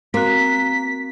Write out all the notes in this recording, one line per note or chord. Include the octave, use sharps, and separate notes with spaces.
A#3 C4 F#4 B6